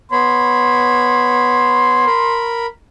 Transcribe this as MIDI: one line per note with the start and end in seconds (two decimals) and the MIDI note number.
0.12 2.05 59
0.12 2.05 73
0.12 2.05 83
0.12 2.52 84
2.06 2.67 70
2.06 2.67 83